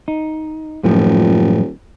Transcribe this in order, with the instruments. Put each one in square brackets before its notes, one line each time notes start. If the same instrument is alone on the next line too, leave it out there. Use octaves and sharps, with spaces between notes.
[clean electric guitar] D#4
[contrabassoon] D#1 [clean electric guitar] F#2 A2 F3